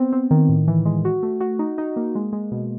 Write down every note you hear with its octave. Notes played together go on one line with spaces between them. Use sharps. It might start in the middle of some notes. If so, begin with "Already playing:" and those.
Already playing: B3 C4
C4
D#3
A2
E3
G#3
F#4
A3
F#4
D#4
D#4
A#3
G#3
G#3
B2